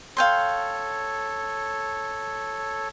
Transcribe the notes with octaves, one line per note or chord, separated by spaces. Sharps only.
A4 C#5 F5 G5 C6